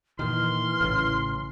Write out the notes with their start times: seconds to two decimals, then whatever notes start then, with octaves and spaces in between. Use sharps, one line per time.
0.19 A#2 D#3 E3 C6 F6
0.81 A1 C#3